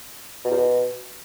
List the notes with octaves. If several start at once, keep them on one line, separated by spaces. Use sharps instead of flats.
B2
E2
B2